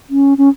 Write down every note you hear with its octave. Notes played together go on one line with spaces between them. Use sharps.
C#4
C#4